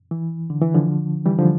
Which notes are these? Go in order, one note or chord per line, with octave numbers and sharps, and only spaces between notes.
E3
D3
E3
D3 F3
E3 G3
D3 F3